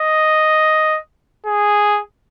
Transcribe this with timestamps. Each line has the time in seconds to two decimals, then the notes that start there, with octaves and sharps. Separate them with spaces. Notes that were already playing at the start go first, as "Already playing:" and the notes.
Already playing: D#5
1.46 G#4